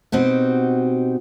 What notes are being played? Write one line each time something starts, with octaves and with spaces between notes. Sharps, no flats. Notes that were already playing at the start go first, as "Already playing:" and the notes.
B2 C4 D#4 F#4 G4